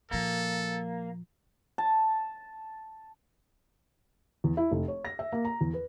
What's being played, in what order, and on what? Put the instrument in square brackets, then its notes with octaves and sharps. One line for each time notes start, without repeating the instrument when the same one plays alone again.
[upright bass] A#2 F3 [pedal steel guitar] A#3 [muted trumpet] A4
[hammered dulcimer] A5
[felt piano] E2
E4
F1
C#5
A#6
E5
A#3
A#5
E2
B4